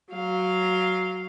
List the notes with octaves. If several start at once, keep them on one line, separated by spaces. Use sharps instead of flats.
F#3 F5